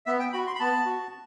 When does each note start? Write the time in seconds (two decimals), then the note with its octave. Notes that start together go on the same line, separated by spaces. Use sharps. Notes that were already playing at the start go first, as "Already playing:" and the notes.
0.06 B3 E5
0.20 G5
0.33 F#4 B5
0.47 C6
0.55 B5
0.60 B3 A5
0.86 F#4